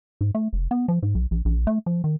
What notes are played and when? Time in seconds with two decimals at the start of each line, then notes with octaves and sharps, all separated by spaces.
0.21 G#2
0.35 A3
0.53 F1
0.71 B3
0.88 F3
1.02 G#2
1.15 B1
1.31 A#1
1.45 A#1
1.67 A3
1.86 F3
2.04 D#3